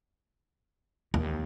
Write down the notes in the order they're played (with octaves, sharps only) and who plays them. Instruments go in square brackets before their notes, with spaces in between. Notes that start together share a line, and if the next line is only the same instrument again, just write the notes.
[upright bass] D#2